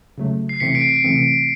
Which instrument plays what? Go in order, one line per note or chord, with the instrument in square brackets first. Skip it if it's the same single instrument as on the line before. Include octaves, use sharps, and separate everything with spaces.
[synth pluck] C#3 F#3 A3
[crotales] C7
[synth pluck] C3 E3 A3 C4 [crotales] B6 C#7
[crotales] C7 D7
C7 D7
[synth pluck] C3 E3 A3 C4